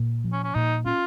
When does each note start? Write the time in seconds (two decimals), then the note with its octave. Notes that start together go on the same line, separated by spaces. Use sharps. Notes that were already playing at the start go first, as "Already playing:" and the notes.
Already playing: A#2
0.24 F3
0.32 C#4
0.44 C#4
0.55 A#2 D#4
0.85 C#4 F4